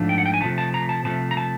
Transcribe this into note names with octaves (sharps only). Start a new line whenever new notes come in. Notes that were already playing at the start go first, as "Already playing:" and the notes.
Already playing: G#2 F3 A3 D4
G5
F#5
G5
G#5
C3 F3 A3 A5
A5
A#5
A5
C3 F3 A3 A5
A#5
A5